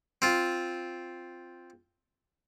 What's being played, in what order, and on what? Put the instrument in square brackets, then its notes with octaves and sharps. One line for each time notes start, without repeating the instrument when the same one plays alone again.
[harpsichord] C4 F4